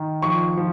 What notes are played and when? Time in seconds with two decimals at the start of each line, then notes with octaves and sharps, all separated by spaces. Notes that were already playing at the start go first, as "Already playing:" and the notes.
Already playing: D#3
0.22 F3 C#6
0.57 F3